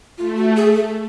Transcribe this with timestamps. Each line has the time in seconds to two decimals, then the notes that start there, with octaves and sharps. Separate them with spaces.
0.18 A3 F4
0.37 F#4
0.56 G#4
0.75 A4